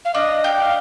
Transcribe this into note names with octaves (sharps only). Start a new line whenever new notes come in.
F5
D4 D#5
G4 F5
G5
F5